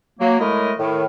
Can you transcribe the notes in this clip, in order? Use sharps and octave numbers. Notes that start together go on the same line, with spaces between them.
F#3 A#3
A2 G#3 A3 E4 A#4 D#5
A2 D#3